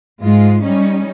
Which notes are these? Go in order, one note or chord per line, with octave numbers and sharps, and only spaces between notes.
G#2 G#3 F4
G3 C#4 D#4